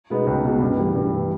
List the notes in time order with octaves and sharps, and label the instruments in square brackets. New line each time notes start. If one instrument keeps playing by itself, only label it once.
[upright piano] B2 G#3 B3 D#4
C#2
B2 G#3 B3 D#4
G2
E3 G3
G2
E3 G3